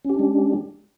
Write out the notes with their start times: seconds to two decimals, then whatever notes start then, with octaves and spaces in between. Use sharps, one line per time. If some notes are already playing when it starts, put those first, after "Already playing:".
0.05 C#4
0.09 G4
0.14 D4
0.19 G#3